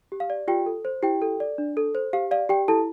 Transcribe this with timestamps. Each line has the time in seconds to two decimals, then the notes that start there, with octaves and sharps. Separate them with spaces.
0.12 G4
0.20 F5
0.30 D5
0.48 F4 G4 G5
0.66 A4
0.85 C5
1.03 E4 G4 G5
1.22 A4
1.40 D5
1.58 D4
1.77 A4
1.95 C5
2.13 G4 F5
2.31 D5 F5
2.49 G4 G5
2.68 E4 A4 A5